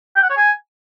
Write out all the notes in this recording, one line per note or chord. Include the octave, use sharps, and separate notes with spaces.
G5
F#5
C#5
G#5